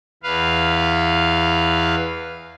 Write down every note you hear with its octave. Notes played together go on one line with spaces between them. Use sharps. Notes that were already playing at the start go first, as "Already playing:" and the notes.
E2 B4 F5